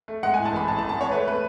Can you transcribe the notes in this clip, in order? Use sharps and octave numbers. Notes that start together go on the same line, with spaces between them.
A3
G#3 F#5
G#5
A2
A5
A1 B5
A2 A5
A5
A1
A5
G#3 C#5
A3 B4
A3 B4